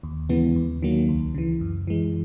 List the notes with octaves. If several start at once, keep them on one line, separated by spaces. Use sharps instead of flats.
D#2
C#3 E3 G#3 B3
D#2
D#3 F#3 A#3
C#2
C#3 E3
F#2
E3 G#3